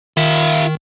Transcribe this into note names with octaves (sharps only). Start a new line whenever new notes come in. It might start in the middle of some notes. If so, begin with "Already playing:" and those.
D#3 F4 E5